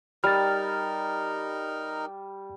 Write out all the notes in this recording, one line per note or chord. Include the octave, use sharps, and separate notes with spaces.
G3 D#4 A#4 F6 A6